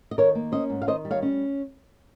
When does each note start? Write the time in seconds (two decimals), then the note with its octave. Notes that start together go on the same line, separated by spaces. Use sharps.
0.11 D#5
0.18 D#3 A#4 C#5
0.35 A#3
0.52 C#4 C5 D#5
0.70 G#2
0.82 F5
0.87 D#3 C5 D#5
1.05 G3
1.11 C#5 F5
1.22 C#4